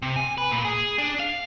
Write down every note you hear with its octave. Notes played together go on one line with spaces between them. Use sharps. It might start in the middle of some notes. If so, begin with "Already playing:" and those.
C3
G#5
B4
A#2
G#4
D4
F5